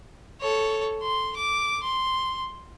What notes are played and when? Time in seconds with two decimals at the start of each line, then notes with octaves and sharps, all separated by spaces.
0.41 A4 C#5
1.03 C6
1.37 D6
1.84 C6